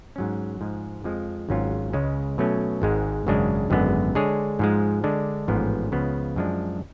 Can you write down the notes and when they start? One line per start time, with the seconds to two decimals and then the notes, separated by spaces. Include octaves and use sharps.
0.16 G#2 F#3 C#4
0.61 G#2 F3 G#3
1.04 F2 F3 G#3
1.49 G#1 G#2 F#3 C#4 F4
1.93 C#2 C#3 G#3 C#4
2.38 B2 F#3 A3 C#4
2.82 G#1 G#2 G#3
3.27 G#1 F#2 C#3 G#3 D4
3.70 G#1 F#2 D3 G#3 B3
4.15 D3 G#3 D4 G#4 C#5
4.59 G#2 F3 G#3
5.04 D3 G#3 D4
5.48 A1 G#2 F3 B3
5.92 C#2 C#3 F3 B3
6.36 F#2 F3 G#3 D4